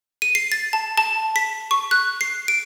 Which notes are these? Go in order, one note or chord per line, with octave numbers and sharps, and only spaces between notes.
D#7
C7
A6
A5
A5
B6
C#6
F#6
C7
D7